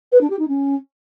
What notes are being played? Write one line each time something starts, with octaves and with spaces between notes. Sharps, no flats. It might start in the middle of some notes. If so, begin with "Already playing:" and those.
B4
D4
G4
D#4
C#4